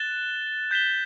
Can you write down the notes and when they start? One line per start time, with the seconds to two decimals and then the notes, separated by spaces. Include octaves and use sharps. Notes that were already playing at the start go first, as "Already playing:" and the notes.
Already playing: F#6 A6 E7 G7
0.71 G6 B6 E7 G7